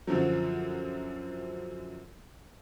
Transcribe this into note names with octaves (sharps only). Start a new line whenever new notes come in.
F#2 D3 F3 F#3